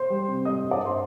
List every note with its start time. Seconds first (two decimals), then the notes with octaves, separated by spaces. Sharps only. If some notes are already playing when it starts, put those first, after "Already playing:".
Already playing: C5 C6
0.10 G3
0.28 C3
0.45 G3 D#5 D#6
0.63 G2
0.71 D5 D6
0.81 G2 C5 C6